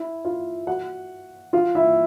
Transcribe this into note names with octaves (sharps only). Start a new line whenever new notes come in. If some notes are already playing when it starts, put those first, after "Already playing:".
Already playing: E4 E5
F4 F5
F#4 F#5
F4 F5
E4 E5